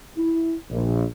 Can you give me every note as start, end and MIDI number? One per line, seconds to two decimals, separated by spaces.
0.17 0.54 64
0.71 1.03 34